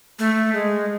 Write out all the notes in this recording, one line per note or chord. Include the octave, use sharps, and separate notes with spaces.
A3
G#3